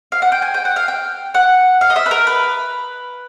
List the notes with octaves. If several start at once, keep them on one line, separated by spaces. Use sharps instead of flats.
F5
F#5
G5
G#5
G5
F#5
F5
G5
F#5
F5
D#5
E5
B4
A#4
B4